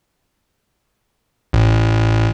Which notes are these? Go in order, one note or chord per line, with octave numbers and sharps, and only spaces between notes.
A1